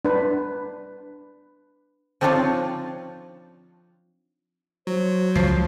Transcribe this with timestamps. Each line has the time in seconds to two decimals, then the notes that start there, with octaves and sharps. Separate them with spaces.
0.05 D4 B4
2.21 F3 C4 D4 D#4 F4 C#5
4.87 F#3 C5
5.35 C#2 F3